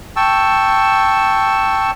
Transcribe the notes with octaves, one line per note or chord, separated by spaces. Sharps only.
G5 A5 C#6 E6